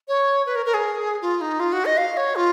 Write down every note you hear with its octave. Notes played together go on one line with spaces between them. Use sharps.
C#5
B4
A#4
A#4
G#4
F4
D#4
F4
F#4
D#5
F5
C#5
F4